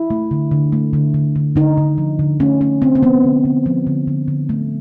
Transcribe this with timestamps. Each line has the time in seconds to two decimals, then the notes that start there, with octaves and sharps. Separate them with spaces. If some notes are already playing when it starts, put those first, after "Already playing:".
Already playing: E4
0.10 A3
0.31 D3
0.51 D3
0.72 A3
0.93 D3
1.14 D3
1.36 D3
1.56 D3 D#4
1.78 D3
1.98 F3
2.19 D3
2.40 A3 C#4
2.61 A3 C#4
2.81 D3 C4
2.95 C4
3.03 F3 B3
3.24 D3
3.45 D3
3.66 F3
3.87 D3
4.07 D3
4.28 D3
4.49 A3